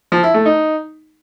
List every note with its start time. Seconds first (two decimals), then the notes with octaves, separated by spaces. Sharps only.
0.12 F3
0.23 E4
0.34 A3
0.45 D#4